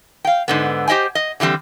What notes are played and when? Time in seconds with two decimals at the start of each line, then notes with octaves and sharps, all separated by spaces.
0.25 F5 G5
0.48 G#2 D3 B3
0.88 G4 C5 D#5 G5 G#5
1.15 D#5
1.40 D3 E3 G3 C4 G4